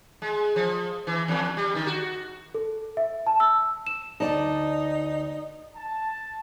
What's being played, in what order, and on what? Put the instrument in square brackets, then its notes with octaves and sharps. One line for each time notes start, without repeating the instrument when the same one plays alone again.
[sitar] G#3
F3
E3
E2
G3
D#3
F#4
[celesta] A4
E5
A5
E6
E7
[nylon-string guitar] D2 D5 A5 [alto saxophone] D#4
[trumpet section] A5